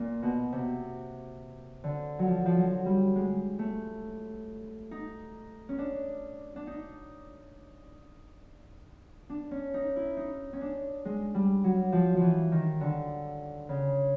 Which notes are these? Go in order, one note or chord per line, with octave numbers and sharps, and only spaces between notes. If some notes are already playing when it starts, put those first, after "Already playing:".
Already playing: A#2
B2
C3
D3
F#3
F3
F3
F#3
G3
G#3
A3
D#4
C#4
D4
D4
D#4
D4
C#4
D#4
E4
D#4
C#4
D4
G#3
G3
F#3
F3
E3 F3
D#3
D3
C#3